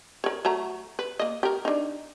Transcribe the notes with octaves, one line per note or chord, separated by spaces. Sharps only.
A#4 C#5
F#3 A3 A#5
B4
A#3 D#5
G4 A#4
D4 D#4